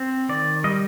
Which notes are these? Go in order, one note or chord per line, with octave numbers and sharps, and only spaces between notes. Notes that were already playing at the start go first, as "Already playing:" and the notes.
Already playing: C4
D#3 D5
G3 D#5